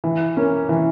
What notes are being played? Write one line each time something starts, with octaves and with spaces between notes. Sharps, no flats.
E3
A#3 C#4
E3